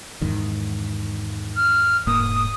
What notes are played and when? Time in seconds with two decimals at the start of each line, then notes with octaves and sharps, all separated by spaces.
0.22 E2 G#2 D#3
1.56 F6
2.07 E1 G#2 A#3 D#6